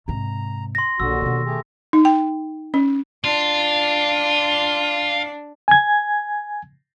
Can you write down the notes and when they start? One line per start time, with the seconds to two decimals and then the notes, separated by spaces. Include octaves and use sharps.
0.08 G#2 C3 A#5
0.75 C6 A#6
1.00 A#1 D#2 D3 D4 F#4 E6
1.22 B2 D#3
1.45 A3 G4 G#4
1.93 D#4
2.05 G5
2.74 C#4
3.24 D4 F4
5.68 G#5 G#6